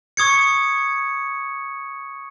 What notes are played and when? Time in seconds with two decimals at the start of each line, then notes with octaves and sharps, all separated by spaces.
0.17 C#6 D#6 G#6 C#7